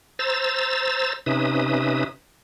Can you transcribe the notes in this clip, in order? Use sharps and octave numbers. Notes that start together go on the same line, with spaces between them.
C5 A#5 E6 A6
C3 C#4 D#4 B4 E5 D#6